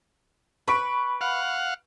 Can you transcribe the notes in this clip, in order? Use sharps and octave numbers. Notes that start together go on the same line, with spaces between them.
B4 B5 C#6 D7
F5 F#5